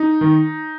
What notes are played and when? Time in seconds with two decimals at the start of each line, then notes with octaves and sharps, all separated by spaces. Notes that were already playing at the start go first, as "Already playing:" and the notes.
Already playing: D#4
0.21 D#3